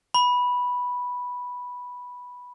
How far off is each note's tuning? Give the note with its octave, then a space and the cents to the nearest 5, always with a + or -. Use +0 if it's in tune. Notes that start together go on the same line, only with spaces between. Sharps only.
B5 -5